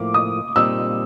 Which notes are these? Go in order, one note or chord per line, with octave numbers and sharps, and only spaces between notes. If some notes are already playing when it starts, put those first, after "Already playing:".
Already playing: A2 F3 A#3 D6
D#6
A#2 G3 C4 D#4 E6